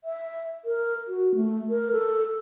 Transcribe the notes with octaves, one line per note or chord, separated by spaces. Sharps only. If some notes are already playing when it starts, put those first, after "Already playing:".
E5
A#4
F#4
A3
A#4
A4